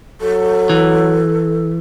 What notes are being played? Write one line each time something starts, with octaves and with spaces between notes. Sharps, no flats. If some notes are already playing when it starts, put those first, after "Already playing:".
F#3 A4
E3